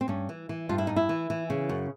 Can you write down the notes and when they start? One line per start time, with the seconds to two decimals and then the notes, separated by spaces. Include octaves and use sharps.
0.01 C4
0.08 G2 C#4
0.29 E3
0.49 E3
0.69 G2 F4
0.78 E4
0.87 G2 D#4
0.96 E4
1.09 E3
1.30 E3
1.50 C#3
1.69 F#2